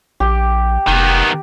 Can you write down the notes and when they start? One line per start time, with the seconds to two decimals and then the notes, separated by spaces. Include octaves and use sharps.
0.20 A#1 G4
0.87 F1 D#3 B3